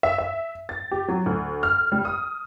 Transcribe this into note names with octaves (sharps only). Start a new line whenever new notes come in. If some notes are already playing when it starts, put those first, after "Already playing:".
E5
E5
A6
G4
F#3
D2
F6
G3
D#6